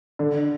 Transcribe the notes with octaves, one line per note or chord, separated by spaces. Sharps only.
D3